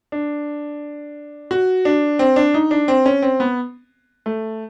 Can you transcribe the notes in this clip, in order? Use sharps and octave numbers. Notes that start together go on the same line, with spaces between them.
D4
F#4
D4
C4
D4
D#4
D4
C4
C#4
C4
B3
A3